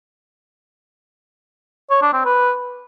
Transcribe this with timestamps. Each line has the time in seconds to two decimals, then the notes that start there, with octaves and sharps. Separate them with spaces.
1.90 C#5
2.02 D4
2.13 C4
2.25 B4